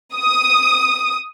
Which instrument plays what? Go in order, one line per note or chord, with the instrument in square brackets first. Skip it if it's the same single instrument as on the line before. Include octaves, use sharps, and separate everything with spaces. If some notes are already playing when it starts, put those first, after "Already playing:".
[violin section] D#6